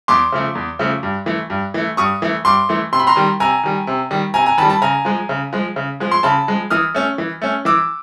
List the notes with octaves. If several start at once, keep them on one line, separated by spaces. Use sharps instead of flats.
E2 C6 D6
C#3 F3 A3
E2
C#3 F3 A3
G2
E3 A3
G2
E3 A3
G2 C#6 D#6
E3 A3
G2 C6 D6
E3 A3
C3 C6
B5
A#5 C6
D#3 G3
C3 G#5 A#5
D#3 G3
C3
D#3 G3
C3 G#5 A#5
G#5 A#5
D#3 G3 A5 B5
A5 B5
C#3 G#5 A#5
F3 G#3
C#3
F3 G#3
C#3
F3 G#3
C6
C#3 A5 B5
F3 G#3
E3 D#6 F6
A3 C#4
E3
A3 C#4
E3 D6 E6